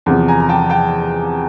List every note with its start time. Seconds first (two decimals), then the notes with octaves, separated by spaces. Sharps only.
0.06 E2 C3 F3
0.28 G#5 A#5
0.40 A#5
0.49 G5 A5
0.70 G5 A5